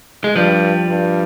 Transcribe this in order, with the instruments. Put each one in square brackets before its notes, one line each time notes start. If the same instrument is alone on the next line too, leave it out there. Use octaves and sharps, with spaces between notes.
[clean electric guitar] G#3
[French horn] G2 [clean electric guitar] F3 G3
[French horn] G2